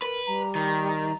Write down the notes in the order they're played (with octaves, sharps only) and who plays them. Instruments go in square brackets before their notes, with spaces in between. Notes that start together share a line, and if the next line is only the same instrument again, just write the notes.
[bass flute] A#4 [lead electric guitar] B4
[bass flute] G3 [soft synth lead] A#5
[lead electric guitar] D#3 [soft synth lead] A#5